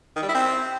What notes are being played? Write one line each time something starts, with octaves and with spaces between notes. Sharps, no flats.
D#3
G3
E4
C4